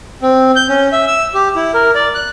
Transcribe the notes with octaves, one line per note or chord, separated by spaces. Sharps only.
C4
G6
C#4
E5
E6
G4
E4
A#4
D5
F#6